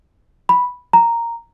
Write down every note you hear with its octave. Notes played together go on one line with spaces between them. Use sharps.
B5
A#5